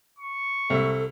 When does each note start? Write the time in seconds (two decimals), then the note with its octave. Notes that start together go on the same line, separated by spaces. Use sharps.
0.19 C#6
0.70 C2 A4 E5